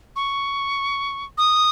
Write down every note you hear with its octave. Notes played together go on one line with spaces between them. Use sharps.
C#6
D#6